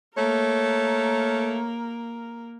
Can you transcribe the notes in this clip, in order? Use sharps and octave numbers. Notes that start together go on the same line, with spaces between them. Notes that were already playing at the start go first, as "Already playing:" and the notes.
A3 A#3 A#4 C#5